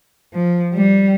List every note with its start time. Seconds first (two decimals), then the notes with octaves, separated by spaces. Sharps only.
0.34 F3
0.74 G3